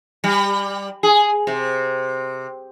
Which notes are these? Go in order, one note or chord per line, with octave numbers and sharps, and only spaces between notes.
G3
G#4
C3